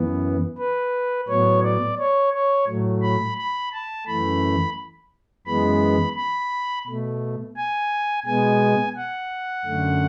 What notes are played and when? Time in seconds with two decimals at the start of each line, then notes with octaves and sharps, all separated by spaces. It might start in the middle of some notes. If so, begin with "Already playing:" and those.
Already playing: F#2 E3 B3
0.58 B4
1.28 A2 F#3 B3 C#5
1.63 D5
1.99 C#5
2.33 C#5
2.68 A2 F#3 A3
3.03 B5
3.38 B5
3.73 A5
4.07 F#2 E3 A3 B5
5.47 F#2 E3 G#3 B3 B5
6.16 B5
6.87 B2 A3
7.56 G#5
8.26 B2 G#3 B3 G#5
8.97 F#5
9.65 F#2 D3 A3